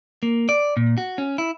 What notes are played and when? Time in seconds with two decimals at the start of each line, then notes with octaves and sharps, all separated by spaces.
0.23 A#3
0.49 D5
0.77 A#2
0.98 F#4
1.18 C#4
1.38 E4